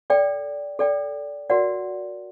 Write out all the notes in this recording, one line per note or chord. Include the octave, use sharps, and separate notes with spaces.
A4 D5 G5
A4 D5 G5
F#4 A#4 D5 F#5